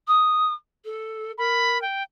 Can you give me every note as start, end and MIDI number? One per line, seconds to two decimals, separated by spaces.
0.07 0.54 87
0.85 1.32 69
1.38 1.81 70
1.38 1.80 83
1.82 2.03 79